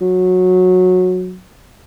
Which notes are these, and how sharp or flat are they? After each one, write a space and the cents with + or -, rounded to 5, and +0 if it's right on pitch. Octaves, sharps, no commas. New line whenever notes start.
F#3 -15